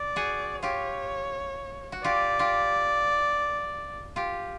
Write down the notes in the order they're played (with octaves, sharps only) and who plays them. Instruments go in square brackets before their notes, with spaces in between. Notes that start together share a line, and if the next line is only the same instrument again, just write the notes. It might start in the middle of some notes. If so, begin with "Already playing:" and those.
Already playing: [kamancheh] D5
[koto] F#4 G#4
[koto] F4 G4 [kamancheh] C#5
[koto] F#4
[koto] F4 G4 [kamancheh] D5
[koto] F4 G4
F4 G4